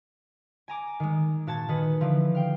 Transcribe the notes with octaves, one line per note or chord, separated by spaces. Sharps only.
G#5 A#5 D6
D#3 G#3
A#2 F#4 A5 G#6 A6
D#3 F#4 G#4 B4
D3 E3 F3
F5 G5